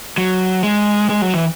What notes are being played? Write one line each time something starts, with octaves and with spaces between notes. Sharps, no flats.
F#3
G#3
G#3
F#3
E3